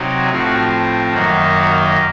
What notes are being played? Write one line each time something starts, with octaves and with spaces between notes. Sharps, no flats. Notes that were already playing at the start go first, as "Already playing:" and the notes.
Already playing: C3 F#3 C4 D#4
A2 F3 C4 F#4
F#2 D#3 A#3 D#4 F#4
F#4